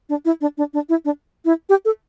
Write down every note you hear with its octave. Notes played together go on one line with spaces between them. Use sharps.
D4
E4
D4
D4
D4
E4
D4
E4
G4
A4